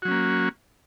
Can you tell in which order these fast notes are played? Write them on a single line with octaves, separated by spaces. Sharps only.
F#4 F#3 C#4 A#3